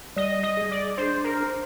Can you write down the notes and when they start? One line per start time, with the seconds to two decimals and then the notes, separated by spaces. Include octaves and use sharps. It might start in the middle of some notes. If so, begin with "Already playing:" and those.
0.17 G3 D#5
0.43 D#5
0.57 G#4
0.71 D5
0.97 D4 C5
1.24 A#4
1.39 C5